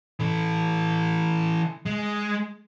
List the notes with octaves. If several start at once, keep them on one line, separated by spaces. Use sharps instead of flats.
E3 A4
G#3